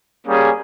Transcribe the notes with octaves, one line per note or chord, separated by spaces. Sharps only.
G3 A#3 C#4 G#4